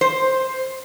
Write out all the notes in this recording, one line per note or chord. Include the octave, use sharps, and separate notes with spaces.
C5